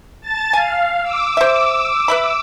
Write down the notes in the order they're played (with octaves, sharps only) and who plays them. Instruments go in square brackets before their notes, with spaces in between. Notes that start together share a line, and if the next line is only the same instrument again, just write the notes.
[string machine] A5 A6
[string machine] F5 [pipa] G#5
[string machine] D6 E6
[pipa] C5 E5
B4 E5 B5